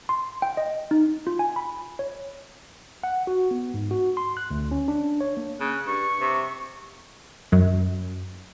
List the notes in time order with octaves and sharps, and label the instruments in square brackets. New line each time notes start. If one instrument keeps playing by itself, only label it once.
[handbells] C6
G5
D#5
D#4
F4
G#5
B5
C#5
[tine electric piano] F#5
F#4
B3
G#2
F#4
C6
F#6
D2
C#4
D4
C#5
A#3
[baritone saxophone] C#3 [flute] F#6
[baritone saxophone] G2 [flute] C#6
[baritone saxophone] C3
[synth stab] F#2